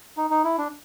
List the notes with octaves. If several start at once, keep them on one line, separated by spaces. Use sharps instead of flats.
D#4
D#4
E4
D4